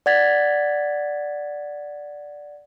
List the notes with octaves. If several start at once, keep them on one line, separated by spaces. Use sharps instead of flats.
D5 F#5 G#6 A6 B6